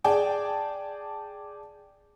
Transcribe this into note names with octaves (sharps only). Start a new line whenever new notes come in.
G#4 D5 G5 A5